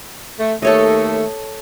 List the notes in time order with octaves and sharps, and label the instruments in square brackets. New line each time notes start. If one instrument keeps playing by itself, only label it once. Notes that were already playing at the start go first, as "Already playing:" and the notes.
[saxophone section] A3
[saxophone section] D#2 A3 [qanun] A4 C#5 D#5